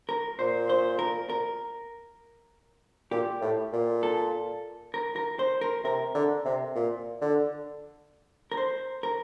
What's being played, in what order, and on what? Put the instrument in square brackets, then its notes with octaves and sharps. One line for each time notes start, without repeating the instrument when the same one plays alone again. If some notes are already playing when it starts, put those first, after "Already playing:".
[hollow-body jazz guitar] A#4
[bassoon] A#2 [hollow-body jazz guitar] C5
[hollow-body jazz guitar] C5
A#4
A#4
[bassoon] A#2 [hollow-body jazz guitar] G4
[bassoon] A2
A#2
[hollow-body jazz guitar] A4
A#4
A#4
C5
A#4
[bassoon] C3 [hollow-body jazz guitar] A#4
[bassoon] D3
C3
A#2
D3
[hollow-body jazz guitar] A#4
C5
A#4